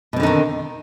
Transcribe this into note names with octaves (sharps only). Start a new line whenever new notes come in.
B2 D3 D#3 C4 D#4